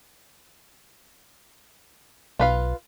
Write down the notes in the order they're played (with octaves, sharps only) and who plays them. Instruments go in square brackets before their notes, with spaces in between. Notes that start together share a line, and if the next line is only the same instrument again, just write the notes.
[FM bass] B1 [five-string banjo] F4 B4 F5